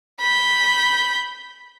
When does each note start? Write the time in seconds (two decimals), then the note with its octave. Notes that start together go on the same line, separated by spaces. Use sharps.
0.21 B5 G6